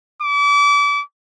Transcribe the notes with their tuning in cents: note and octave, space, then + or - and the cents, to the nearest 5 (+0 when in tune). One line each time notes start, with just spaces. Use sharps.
D6 -35